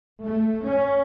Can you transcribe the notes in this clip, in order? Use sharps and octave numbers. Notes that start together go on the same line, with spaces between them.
A3
C#4